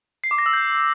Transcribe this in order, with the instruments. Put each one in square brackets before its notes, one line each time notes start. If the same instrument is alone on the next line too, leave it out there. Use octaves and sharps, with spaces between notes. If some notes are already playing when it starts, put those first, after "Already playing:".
[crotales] C7
D6
A#6
E6
G6